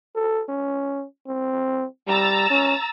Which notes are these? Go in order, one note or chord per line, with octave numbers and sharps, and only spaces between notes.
A4
C#4
C4
G3 A#5 E6 A6
C#4